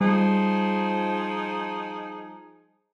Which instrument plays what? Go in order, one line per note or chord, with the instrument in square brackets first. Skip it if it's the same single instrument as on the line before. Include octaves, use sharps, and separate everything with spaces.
[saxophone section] F3 D#4 G#4 [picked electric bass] G3